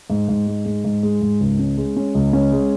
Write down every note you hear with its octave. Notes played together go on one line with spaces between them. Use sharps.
G#2
G#2
G#3
G#2
G#2
G#3
G#2
C#2
C#4
G#3
C#4
C#2
C#4
G#3